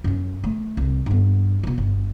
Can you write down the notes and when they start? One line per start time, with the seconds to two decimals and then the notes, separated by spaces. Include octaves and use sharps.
0.04 F#2 C#4
0.44 A3
0.77 C2
1.06 G2 B3
1.63 D2 B2
1.78 G1